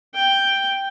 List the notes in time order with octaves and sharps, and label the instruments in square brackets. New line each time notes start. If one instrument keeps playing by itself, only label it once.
[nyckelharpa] G5